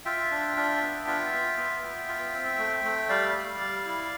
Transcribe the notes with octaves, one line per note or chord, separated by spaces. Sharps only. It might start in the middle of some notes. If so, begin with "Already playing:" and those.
F4 E5 G5
D4
D4
B3
F4
F4
B3
B3
F4
C4
A3
A3
G3 D5 F5
G3
G3
E4